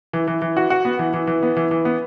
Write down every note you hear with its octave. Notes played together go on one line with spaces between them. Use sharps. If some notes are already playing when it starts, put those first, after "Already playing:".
E3
E3
E3
F#4
F#4
B3
E3
E3
E3
B3
E3
E3
B3